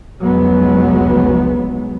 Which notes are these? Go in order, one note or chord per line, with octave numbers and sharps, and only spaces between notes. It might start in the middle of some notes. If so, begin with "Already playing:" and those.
F1 C#2 F#3 G#3 B3